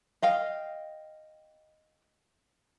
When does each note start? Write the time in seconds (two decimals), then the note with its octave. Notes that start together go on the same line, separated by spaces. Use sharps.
0.22 D#5 F5 G5